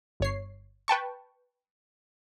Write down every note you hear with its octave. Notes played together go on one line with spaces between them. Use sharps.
G1 C#5 C7
B4 G5 A5 C#6